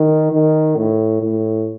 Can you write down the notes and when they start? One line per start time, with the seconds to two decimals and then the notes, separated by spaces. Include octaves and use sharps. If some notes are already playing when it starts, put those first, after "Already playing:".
Already playing: D#3
0.32 D#3
0.76 A2
1.22 A2